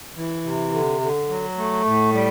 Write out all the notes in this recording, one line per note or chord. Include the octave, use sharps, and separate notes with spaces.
E3
C3
D3
D3
F#3
A3
A2
G3